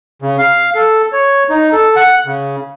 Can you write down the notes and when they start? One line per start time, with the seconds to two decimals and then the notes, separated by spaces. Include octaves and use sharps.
0.22 C#3
0.38 F5
0.75 A4
1.13 C#5
1.50 D#4
1.72 A4
1.96 F#5
2.26 C#3